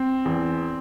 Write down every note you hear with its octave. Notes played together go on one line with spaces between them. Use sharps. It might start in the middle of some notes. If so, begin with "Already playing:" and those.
Already playing: C4
E2